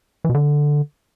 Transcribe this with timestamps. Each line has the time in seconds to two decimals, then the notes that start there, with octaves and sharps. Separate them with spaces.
0.24 E3
0.29 B2
0.34 D3